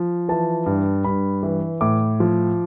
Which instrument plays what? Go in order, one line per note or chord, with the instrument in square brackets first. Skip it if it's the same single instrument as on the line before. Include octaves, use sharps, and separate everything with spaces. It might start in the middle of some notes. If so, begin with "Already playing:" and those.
Already playing: [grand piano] F3
E3 A5
G2
G2 B5
E3
A2 D6
F3